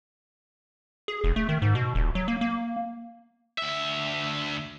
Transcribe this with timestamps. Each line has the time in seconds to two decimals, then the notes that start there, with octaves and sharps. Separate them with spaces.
1.08 G#4
1.24 E1
1.36 A3
1.49 D#3
1.62 G#2
1.75 B2
1.95 D#1
2.15 F#3
2.28 A#3
2.41 A#3
3.58 D2 E5